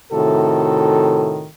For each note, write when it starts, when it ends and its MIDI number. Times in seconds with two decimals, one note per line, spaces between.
0.12 1.45 45
0.12 1.45 48
0.12 1.45 51
0.12 1.45 66
0.12 1.45 69